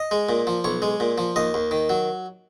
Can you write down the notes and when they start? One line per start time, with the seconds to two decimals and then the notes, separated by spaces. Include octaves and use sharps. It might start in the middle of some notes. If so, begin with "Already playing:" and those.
Already playing: D#5
0.11 G#3
0.29 A#2
0.47 F3
0.64 B1 C#5
0.82 G#3
1.00 A#2
1.18 F3
1.36 D#2 D#5
1.54 D#2
1.71 D#3
1.89 F#3